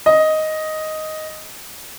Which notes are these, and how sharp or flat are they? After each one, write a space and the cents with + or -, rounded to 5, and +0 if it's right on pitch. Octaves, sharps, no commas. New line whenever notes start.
D#5 +5